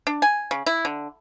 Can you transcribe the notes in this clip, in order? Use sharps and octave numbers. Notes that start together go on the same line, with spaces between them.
D4
G#5
C#3
E4
D3